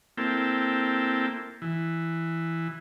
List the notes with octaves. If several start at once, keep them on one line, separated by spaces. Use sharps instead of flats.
A#3 C4 E4 A4 G5
E3